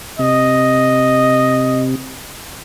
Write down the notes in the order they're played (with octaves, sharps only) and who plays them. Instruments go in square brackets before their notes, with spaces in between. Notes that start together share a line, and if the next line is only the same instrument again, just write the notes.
[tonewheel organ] C3 [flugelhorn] D#5